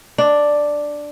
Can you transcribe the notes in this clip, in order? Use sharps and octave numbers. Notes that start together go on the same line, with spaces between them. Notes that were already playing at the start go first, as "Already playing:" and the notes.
D4